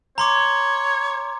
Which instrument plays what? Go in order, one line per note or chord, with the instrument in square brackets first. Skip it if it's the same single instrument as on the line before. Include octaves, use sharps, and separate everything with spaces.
[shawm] C#5 [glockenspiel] A#5 C6 D6